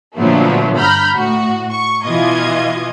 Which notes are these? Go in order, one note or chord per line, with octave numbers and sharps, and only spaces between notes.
A#2 D3 F3 F#3 A3 B3
G2 A#5 B5 F6 G6
A2 F#4
C#6
B2 E3 F4 D#5 G#6